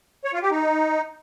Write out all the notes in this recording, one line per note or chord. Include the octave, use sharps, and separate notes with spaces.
C#5
F4
G4
D#4